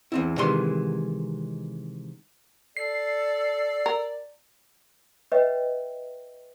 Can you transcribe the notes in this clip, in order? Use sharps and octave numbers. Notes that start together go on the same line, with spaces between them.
E2 C4 E4
C3 D#3 E3 G#3 C6
A4 D5 C7
A#4
B4 C#5 D#5 E5 F#5 G5